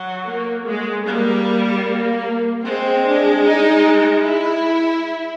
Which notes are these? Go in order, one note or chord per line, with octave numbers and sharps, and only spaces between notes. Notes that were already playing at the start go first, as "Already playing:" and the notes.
Already playing: F#3
A#3
G#3
G3 A#3
A#3
G#3 C4
D4
D#4
E4